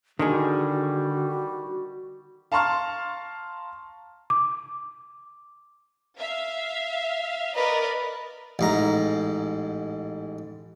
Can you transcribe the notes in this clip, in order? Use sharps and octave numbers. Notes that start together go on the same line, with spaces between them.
D3 D#3 G3 D4 F#4 G#4
F5 A5 A#5 C6 C#6 F6
D6
E5 F5
A#4 B4 D5 D#5
A1 G#2 A#5